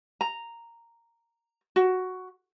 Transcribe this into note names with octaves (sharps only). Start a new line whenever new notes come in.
A#5
F#4